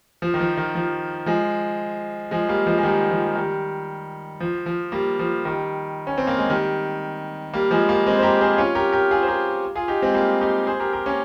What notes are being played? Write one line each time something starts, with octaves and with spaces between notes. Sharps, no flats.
F3
D#3
F3
D#3
F3
F3 G#3
F3 G#3
G3 A#3
F3 G#3
G#3
D#3 G3
F3
D#3 G3
F3
F3
G3 A#3
F3
D#3 G3
C#4
C4
A#3
G#3
D#3 G3
G3 A#3
F3 G#3
G3 A#3
G#3 C4
C5
G4 A#4
G#4 C5
C#4 F4
G4 A#4
G4 A#4
F4 G#4
C5
G4 A#4
F4 G#4
D#4 G4
G#3 C4
G3 A#3
D#4 G4
G#4 C5
G4 A#4
G4 A#4
A#3 C#4